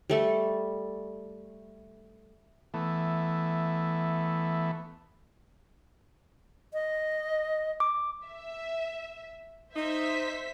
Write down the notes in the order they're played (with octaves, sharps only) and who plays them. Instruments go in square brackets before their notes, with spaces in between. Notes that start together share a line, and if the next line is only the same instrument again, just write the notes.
[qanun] G3 A3 A4
[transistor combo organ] E3 A3 B3
[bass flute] D#5
[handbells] D6
[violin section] E5
[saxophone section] D#4 [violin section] C5 E5 B6